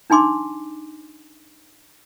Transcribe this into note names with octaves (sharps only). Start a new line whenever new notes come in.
D4 D#4 G#5 C6 D6